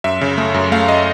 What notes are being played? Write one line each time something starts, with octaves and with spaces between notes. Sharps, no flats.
F#2 E5
C#3
A3
F#2
A3 F5
D#5